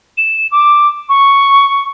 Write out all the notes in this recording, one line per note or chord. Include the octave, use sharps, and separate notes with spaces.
E7
D6
C#6